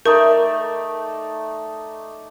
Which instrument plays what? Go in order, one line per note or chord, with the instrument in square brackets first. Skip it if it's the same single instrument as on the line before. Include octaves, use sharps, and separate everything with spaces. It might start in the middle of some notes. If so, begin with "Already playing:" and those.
[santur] A3 D#4 D5 [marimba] A#4